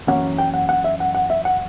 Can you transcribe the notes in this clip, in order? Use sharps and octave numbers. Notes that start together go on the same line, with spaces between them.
F#2 E3 A#3 C#4 F#5
G5
F#5
F#5
E5
F#5
F#5
E5
F#5